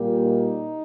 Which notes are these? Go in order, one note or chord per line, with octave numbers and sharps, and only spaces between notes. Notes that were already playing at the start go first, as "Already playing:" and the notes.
Already playing: A#2 G3 A#3
D#4